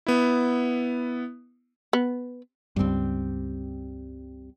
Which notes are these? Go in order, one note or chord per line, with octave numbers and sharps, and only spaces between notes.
B3 E4
B3
C#2 G2 G3 C4